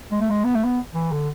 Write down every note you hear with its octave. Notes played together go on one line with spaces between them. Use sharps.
G#3
A3
G#3
B3
A3
B3
E3
D3